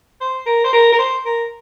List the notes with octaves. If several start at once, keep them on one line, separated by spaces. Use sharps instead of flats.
C5
A#4
C5
A#4
A#4
C5
A#4